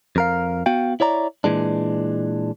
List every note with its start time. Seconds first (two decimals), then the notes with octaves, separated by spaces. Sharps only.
0.16 F2 A#4 F5
0.66 B3 F#4 F5 G5
1.00 E4 C#5 D5 A#5
1.44 A#2 E3 G#3 D4